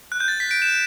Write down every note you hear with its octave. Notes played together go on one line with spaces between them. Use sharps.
F#6
G6
A6
B6
D7
E7